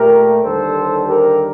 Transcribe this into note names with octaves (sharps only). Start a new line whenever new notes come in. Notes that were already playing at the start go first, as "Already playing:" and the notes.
Already playing: A#2 A3 G4 A#4
D#2 D3 G3 A4 C5
G4 A#4